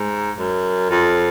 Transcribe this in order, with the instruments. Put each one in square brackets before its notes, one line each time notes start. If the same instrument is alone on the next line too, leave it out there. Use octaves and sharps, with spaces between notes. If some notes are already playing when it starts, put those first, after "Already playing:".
Already playing: [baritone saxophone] G#2
F#2
F2